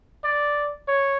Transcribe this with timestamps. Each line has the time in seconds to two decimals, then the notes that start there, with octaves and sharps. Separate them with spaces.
0.24 D5
0.88 C#5